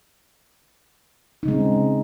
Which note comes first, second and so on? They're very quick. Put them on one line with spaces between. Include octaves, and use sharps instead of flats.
D#4 C#3 G#3 C4